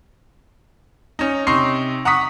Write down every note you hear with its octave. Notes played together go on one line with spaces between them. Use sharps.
C#4 D#4
C3 C#4 D#4 C6 C#6 C7
F#5 A#5 C#6 D#6 B6